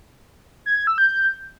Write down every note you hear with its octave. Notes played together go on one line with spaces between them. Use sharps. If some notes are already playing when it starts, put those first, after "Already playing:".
G#6
G#6
E6
G6